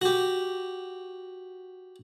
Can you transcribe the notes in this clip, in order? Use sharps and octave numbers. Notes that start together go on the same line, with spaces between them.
F#4 G4